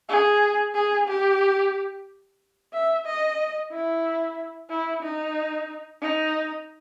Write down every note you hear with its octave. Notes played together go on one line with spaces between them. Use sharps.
G#4
G#4
G4
E5
D#5
E4
E4
D#4
D#4